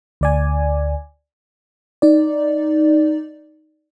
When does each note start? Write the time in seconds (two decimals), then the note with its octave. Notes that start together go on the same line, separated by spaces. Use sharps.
0.21 D2 D5 G#5
2.02 D#4 D5